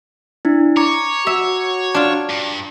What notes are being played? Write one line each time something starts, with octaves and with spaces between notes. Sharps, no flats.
D4 E4
C#5 A#5 D6
F#4 E5
D4 F4
G2